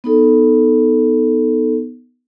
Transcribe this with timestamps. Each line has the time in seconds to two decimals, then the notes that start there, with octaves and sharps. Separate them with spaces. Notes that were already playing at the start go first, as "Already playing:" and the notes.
0.04 B3 D#4 A4